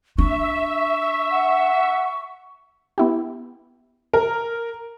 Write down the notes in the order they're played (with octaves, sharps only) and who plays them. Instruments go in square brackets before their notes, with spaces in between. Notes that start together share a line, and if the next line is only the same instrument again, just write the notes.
[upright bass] D4 [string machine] E5 [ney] C#6
[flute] F#5
[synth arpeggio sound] B3 E4 G4
[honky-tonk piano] A#4